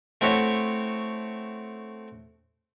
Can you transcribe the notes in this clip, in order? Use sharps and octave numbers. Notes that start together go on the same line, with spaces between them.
A3 C4 E4 F#4 C#5 E5